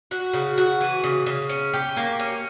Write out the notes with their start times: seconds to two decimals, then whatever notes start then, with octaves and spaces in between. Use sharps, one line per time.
0.11 F#4
0.33 C#3
0.58 F#4
0.81 E3
1.04 C#3
1.26 C#3
1.49 C#4
1.73 G4
1.97 A#3
2.20 C#4